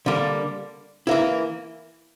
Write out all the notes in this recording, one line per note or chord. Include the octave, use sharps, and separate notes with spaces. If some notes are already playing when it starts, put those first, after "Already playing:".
D3 G3 A#3
E3 A#3 E4